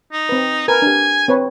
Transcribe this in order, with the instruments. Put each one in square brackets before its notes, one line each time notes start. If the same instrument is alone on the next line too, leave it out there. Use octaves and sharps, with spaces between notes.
[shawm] D#4
[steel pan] C4 B4
[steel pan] A#4 B4 [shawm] G#5
[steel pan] D4 G4
C4 B4 C#5